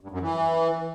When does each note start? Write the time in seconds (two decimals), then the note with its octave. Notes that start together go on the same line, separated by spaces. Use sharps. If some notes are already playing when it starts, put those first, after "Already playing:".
0.01 G2
0.11 F#2
0.21 E3